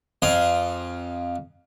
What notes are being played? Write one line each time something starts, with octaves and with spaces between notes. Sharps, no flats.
F2 F4 G#4